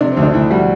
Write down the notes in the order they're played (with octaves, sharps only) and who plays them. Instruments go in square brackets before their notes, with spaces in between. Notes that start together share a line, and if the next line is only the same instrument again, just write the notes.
[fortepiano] C3 D4
C4
D2
D4
D2 E4
G3 F#4